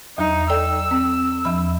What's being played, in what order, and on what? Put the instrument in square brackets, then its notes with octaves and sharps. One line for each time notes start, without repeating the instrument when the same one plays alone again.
[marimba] E2 F#3 [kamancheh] D#4
[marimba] A4 D5 G5 [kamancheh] E6
[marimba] C4
E2 F3 B5